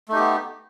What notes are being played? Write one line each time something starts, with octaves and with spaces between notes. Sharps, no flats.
A3 B3 D#4 G4